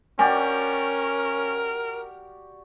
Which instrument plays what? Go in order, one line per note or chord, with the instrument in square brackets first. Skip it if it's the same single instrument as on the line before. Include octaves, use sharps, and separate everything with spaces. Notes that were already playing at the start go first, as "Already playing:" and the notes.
[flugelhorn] C#4 [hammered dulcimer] F#4 G4 D5 [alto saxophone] A#4 [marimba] G#5